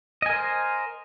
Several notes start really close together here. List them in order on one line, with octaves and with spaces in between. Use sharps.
D#5 G#5 A#4 C5